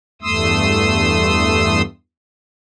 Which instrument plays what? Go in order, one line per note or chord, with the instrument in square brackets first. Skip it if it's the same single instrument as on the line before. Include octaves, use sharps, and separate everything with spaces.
[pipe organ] E2 G2 A3 C6 D#6 E6